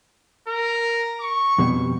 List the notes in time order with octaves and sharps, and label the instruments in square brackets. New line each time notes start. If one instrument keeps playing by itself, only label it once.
[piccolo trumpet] A#4
C#6
[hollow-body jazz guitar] F2 B2 G3